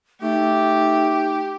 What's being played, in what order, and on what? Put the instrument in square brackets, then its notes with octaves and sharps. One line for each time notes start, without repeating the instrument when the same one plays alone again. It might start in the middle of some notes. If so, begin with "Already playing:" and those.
[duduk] A3 [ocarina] D#4 [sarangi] G4